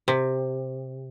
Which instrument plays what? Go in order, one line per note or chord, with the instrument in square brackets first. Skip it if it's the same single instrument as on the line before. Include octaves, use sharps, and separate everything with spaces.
[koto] C3